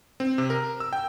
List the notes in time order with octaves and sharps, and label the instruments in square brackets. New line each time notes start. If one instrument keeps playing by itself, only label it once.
[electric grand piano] C4
C3
A#4
E6
G5